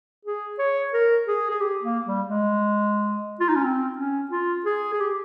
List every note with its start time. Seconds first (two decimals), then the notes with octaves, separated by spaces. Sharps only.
0.25 G#4
0.59 C#5
0.94 A#4
1.28 G#4
1.51 G#4
1.61 G4
1.83 A#3
2.07 G3
2.28 G#3
3.40 F4
3.49 D#4
3.56 C#4
3.64 C4
3.98 C#4
4.32 F4
4.66 G#4
4.93 G#4
5.01 G4